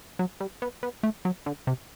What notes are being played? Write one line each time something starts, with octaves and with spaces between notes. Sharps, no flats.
F#3
G3
B3
B3
A3
F#3
D3
C3